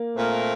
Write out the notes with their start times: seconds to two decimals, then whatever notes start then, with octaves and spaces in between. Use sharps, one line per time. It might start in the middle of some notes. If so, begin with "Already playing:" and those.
Already playing: A#3
0.15 A#2 A3 C4 F4 A#4